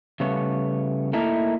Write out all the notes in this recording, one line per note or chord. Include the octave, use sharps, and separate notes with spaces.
C#3 G3 A3 B3 C#5
A3 A#3 D#4 E4 A4 A#4